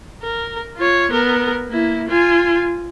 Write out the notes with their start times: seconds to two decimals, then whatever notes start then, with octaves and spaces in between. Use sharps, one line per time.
0.22 A#4
0.77 F4 C#5
1.11 B3 A#4
1.68 A#3 E4
2.08 F4 G#5